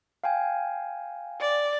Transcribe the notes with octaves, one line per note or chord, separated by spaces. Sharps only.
F5 G5 G#5
D5